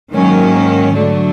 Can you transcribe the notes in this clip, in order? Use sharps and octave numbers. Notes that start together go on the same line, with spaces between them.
G#2 D#3 F#3 A#3 C#4
D3 F#3 A3 D4